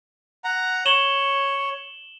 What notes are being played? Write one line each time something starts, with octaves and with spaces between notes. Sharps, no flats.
F#5 A#5
C#5 E7 F#7 G7